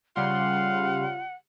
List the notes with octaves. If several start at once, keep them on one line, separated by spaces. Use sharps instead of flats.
C#3 G3 F4 F#5 C6